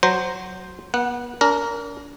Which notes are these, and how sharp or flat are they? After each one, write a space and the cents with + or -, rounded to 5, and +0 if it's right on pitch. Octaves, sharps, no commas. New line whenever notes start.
F#3 +0 C5 +0 A#5 +0
B3 -35 F#5 +0
D4 -40 A#4 +0